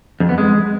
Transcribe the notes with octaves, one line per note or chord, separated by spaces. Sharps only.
F2
B3
G#3